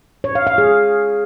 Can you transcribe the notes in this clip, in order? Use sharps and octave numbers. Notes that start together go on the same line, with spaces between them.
C#5
F5
F5
G#4